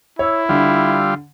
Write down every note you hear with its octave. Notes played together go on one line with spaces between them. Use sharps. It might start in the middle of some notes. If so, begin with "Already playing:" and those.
E4 C#5 E6
D3 G3 F4